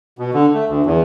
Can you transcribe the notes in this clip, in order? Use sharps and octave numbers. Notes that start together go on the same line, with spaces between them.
B2
D3
A3
D2
E2